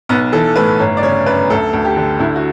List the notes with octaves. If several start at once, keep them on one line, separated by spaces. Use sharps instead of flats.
B1 B3
E3 A4
A2 B4
G1 C#5
D5
C#3 C#5
F#2 B4
D2 A4
D2
G4
D3
D2 E4
F#4